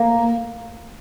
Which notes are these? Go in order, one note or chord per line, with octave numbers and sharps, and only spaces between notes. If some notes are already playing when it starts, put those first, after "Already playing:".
Already playing: A#3